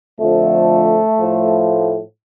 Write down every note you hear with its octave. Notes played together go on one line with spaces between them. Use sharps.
F2 D3 F3 A3
A2 F3